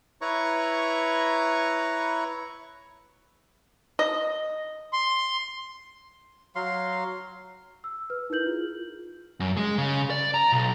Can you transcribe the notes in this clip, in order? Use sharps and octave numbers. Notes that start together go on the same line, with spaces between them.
E4 B4 C#5 A#5 C#6
D#5
C6
F#3 F5 C6
E6
B4 F6
D#4 E4 A#4 G6 F#7
F4 G#4
F#2
G#3
C#3
D5
A#5
B1